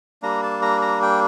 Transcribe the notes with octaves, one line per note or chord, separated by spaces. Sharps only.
G3 A#3 D4 A#5
A5
A#5
A#5
G5